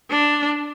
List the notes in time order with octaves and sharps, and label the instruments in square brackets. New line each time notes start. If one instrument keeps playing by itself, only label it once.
[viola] D4